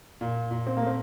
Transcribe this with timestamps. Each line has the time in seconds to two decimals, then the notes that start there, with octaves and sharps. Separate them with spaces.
0.21 A#2
0.51 A#2
0.67 C4
0.77 A3 A#3
0.87 C4